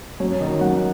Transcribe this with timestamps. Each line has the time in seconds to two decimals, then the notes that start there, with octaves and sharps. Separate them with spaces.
0.20 F#2 C#5
0.41 D#3 D#5
0.44 F#3
0.61 F#2 F#5